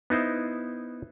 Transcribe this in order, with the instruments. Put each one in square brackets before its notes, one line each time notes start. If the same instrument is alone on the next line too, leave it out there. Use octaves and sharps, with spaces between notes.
[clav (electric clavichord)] B3 D#4 E4 C5